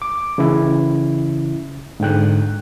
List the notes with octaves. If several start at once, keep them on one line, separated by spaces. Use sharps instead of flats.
D6
C#3 E3 C#4 E4
G#2 D3 G5 F#6